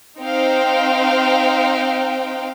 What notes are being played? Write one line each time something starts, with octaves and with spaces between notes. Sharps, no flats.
C4 D#4 C5 F5 G5